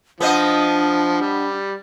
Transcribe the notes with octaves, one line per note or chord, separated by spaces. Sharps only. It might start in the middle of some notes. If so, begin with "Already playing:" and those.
F3 B3 D4 C5 D#5
G3